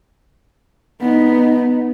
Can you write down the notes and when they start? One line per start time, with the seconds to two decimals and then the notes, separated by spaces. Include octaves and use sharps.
1.01 B3 D#4